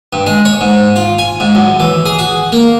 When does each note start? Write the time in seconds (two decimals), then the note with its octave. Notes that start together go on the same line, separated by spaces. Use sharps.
0.13 G2
0.26 G#3
0.45 C#5
0.61 G#2
0.96 F4
1.19 G#5
1.40 G#2
1.55 F#2
1.80 E3
2.06 G#4
2.19 F#4
2.52 A#3